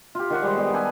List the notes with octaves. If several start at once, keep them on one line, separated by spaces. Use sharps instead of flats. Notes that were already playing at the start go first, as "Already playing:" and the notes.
F4 G4
D#3 F#5 C#6
G3 G#3 C5
G3 B3
G4 A4 B4 G#5